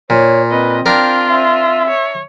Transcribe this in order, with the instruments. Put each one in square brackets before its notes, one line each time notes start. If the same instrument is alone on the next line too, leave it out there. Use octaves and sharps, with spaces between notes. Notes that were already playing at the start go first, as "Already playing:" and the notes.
[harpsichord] A#2 [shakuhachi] C#5
[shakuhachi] C4 [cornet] B4 [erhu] D#5
[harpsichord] D4 A#4 [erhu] F4 [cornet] G5
[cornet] E5
[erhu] C#5